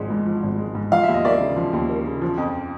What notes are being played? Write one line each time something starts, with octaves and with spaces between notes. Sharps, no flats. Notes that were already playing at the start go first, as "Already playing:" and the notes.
Already playing: G#1 F3 G#3
G#2
F3
G#1
G#3
G#2
F3 F5
D#2 E5
D#5
A#3 D5 E5
C#3
F3
D#2
A#3
C#3
F3
F2